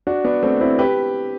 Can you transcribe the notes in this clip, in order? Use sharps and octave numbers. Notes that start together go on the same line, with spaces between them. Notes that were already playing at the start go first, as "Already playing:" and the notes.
D4 F#4
B3 D4
A3 C4
C4 E4
G4 B4